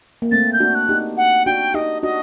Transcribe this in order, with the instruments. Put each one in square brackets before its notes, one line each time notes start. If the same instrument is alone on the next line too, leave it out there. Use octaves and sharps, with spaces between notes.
[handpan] A#3
[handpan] A3 C4 [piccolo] A6
[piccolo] G6
[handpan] D4 F#4
[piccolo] F#6
[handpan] D#4 G4
[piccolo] F#5
[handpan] D4 F#4 [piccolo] G5
[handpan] D#4 G4 [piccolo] D#5
[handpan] D4 F#4 [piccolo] D#5